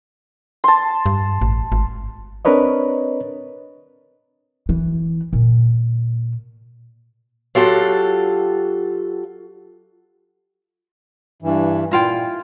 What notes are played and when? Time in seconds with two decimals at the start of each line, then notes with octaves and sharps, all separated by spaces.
0.64 A5 C6
1.06 G2
1.41 A1
1.72 G#1
2.45 C4 D4 A#4 B4 C#5 D#5
4.69 E3
5.33 A#2
7.55 F#3 F4 G4 A4 F#5
11.42 G2 E3
11.91 A#2 E4 F4 G5